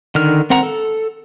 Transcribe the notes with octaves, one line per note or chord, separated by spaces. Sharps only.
D3 D#3 F6
C4 A#4 F#5 A#5
A4